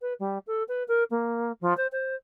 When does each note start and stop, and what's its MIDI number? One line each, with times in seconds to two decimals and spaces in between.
0.01 0.13 71
0.19 0.38 55
0.47 0.63 69
0.68 0.83 71
0.88 1.03 70
1.10 1.52 58
1.61 1.76 53
1.77 1.87 72
1.92 2.15 72